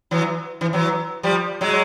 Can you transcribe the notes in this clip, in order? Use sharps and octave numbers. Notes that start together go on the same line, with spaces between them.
E3 F#3
E3
E3 F#3
F3 G3
F#3 G#3